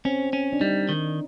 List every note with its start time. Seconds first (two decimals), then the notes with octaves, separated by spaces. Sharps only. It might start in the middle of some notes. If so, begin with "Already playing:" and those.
0.05 C4 C#4
0.33 C#4
0.53 D4
0.61 G3 D#4
0.89 D#3